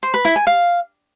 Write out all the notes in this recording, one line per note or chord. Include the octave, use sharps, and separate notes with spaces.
C5
B4
E4
G#5
F5